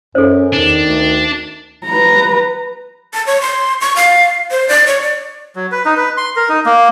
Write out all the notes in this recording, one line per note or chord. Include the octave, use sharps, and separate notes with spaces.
F#2 C#4 A4 C5
E2 D#3 D4
D2
B4 A#5
A5
C#5
C6
C#6
F5
C5
D5
C#5
D5
F#3
B4
D#4
B4
C6
A#4
D#4
A#3